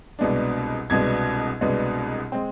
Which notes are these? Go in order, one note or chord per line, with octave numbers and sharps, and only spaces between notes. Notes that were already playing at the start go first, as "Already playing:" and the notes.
C2 B2 G#3 B3 D4
C2 B2 G#3 B3 D4 G#6
C2 B2 G#3 B3 D4
G#3 C4